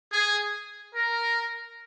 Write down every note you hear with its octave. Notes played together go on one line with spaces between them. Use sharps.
G#4
A#4